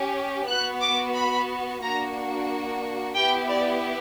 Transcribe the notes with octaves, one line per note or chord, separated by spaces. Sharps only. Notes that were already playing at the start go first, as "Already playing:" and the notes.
Already playing: C#4 G4
B3 F#4 F#6
D6
B5
A#3 D4 F#4 A#5
B3 E4 G4 G5
D5